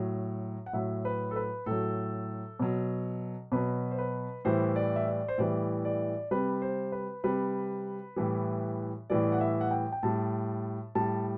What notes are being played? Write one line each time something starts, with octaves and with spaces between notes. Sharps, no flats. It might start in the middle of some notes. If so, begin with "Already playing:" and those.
Already playing: A2 F#3
F#5
A2 F#3 E5
B4
A4
B4
A2 F#3 A4
B2 F#3
B2 F#3 B4
C5
B4
A2 E3 G3 C5
D5
E5
D5
C5
A2 E3 G3 D5
D5
C3 G3 B4
C5
B4
C3 G3 B4
A2 E3 G3
A2 E3 G3 D5
F#5
E5
F#5
G5
G5
A2 G3 A5
A2 G3 A5